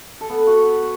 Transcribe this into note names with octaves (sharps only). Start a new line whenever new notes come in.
A4
B3
B4
F#4